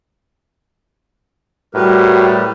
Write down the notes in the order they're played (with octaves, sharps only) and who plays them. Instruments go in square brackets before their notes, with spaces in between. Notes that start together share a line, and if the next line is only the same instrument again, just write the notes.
[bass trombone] A2 [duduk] G3 [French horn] F#4 [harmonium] G4 A#4 B4